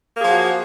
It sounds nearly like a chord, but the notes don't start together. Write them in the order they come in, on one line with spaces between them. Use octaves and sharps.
A#3 G#4 F3 F#4